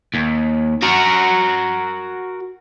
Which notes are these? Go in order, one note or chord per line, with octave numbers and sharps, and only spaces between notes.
D#2
F#4 A#4